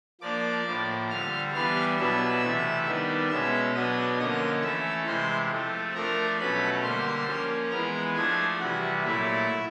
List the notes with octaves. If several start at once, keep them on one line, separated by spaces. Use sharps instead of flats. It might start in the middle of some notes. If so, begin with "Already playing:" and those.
F3 A#3 D4 D5 D6
A2 F3 A#3
D3 G3 C4 F5 F6
E3 G3 B3 D4 F5 F6
B2 F#3 B3 D4 E5 E6
C3 E3 A3
D#3 G3 B3 D4
B2 G#3 C#4 E5 E6
B2 F#3 B3 D4 D#5 D#6
D3 F3 A#3 C#4 D#5 D#6
E3 A3 C#4 E5 E6
C3 E3 G#3 C4 C5 C6
F3 A3 C4
F3 A3 D4 A#4 A#5
B2 F#3 A3 C#4 B4 B5
D3 G3 A#3 C5 C6
F3 A#3 C#4
E3 G#3 B3 A#4 A#5
F3 A3 D4 G#4 G#5
C3 E3 G3 F#4 F#5
A#2 F#3 A3 E4 E5